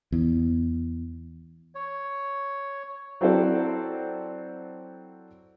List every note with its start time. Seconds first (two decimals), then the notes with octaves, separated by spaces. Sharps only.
0.12 E2
1.75 C#5
3.21 F#3 C4 E4 A4 C5 D5